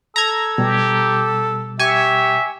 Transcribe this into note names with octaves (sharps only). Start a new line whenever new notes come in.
A4 A#5 G#6
B2 G3 G4
G4 E5 G#5 C#6